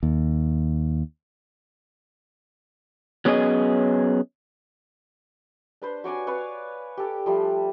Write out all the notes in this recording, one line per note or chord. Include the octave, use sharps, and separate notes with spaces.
D#2
F#3 B3 C#4 G#4 D#5
D4 B4 C5
F#4 C#5 D5 G#5
B4 C#5 D5 F5
G4 A4 D6
F3 G3 A3